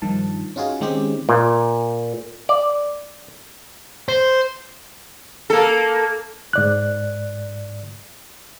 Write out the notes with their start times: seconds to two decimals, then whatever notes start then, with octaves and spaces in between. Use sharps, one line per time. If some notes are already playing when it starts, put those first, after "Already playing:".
0.02 G2 D#3 F3 A5
0.56 C#4 D#4 F4 F#4 G#4
0.81 D#3 G#3 C4 C#4 G4
1.29 A#2
2.49 D5
4.09 C5
5.50 A#3 A4
6.53 G#2 D5 F#6